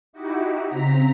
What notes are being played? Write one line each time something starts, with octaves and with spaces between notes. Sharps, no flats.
D#4 E4 F#4 G4
C#3 C4 A#5 B6